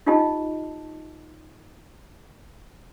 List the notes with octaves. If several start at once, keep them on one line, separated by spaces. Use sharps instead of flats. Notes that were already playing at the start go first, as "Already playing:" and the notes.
D#4 F4 G4 D#5 A5